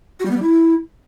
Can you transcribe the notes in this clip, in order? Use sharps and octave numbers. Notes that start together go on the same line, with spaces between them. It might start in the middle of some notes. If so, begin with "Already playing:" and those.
F#4
G3
B3
G3
E4